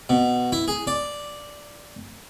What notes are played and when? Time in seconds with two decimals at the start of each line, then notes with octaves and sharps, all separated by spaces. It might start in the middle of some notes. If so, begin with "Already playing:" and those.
0.09 B2
0.52 E4
0.68 G#4
0.87 D5